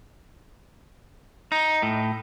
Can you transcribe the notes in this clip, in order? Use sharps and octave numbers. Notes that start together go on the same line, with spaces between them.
D#4
A2